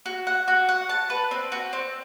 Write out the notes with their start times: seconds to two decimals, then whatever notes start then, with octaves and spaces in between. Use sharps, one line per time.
0.06 F#4
0.27 F#5
0.48 F#4
0.69 F#5
0.89 A5
1.10 B4
1.31 C4
1.52 F#4
1.73 C4